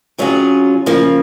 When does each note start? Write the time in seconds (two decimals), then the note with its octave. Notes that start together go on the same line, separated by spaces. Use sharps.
0.18 C3 F#3 C#4 F4 G#4
0.86 C#3 F3 A#3